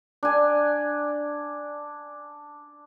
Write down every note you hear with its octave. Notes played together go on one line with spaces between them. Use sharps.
D4 G#5